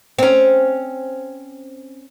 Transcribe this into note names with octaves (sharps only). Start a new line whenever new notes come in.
C4 C#4